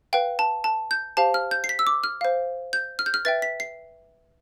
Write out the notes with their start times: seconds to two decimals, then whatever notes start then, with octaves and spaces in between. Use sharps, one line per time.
0.13 B4 F5 G5
0.39 A5
0.64 A5
0.91 G6
1.17 G4 C5 F5 A5
1.34 F6
1.51 G6
1.64 C7
1.69 B6
1.79 E6
1.87 D6
2.04 F6
2.21 C5 F5
2.73 G6
2.99 F6
3.06 G6
3.14 F6
3.25 B4 E5 G5 A6
3.42 B6
3.60 C7